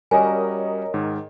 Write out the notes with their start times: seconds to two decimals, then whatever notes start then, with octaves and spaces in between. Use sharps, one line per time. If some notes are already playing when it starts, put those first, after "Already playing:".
0.11 G3 C#4 F#4 A#4 C#5 D#5 G#5
0.94 G#2 D#3